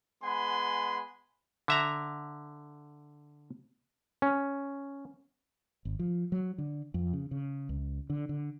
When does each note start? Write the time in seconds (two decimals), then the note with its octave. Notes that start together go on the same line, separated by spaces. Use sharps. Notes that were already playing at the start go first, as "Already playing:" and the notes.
0.24 G#3 B3 F#5 G#5 B5 C6
1.68 D3 E5 A#5
4.22 C#4
5.85 G#1
5.99 F3
6.32 F#3
6.58 D3
6.94 F2
7.13 C#3
7.31 C#3
7.69 C#2
8.10 D3
8.29 D3